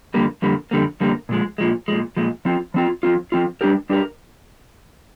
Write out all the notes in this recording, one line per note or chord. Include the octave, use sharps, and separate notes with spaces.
F2 D3 G3 A#3
F2 D3 G3 A#3
F2 D3 G3 A#3
F2 D3 G3 A#3
A#2 F3 G#3
A#2 F3 G#3
A#2 F3 G#3
A#2 F3 G#3
F3 C4 F4
F3 C4 F4
F3 C4 F4
F3 C4 F4
G3 D4 G4 A#4
G3 D4 G4 A#4